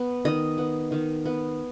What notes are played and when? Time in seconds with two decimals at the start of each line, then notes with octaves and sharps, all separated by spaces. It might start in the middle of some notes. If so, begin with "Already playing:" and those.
Already playing: B3
0.25 D#3 D#5
0.58 B3
0.92 D#3
1.26 B3